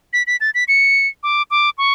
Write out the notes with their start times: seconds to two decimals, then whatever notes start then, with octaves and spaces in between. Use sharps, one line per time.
0.13 B6
0.27 B6
0.41 A6
0.54 B6
0.68 C#7
1.23 D6
1.50 D6
1.78 C#6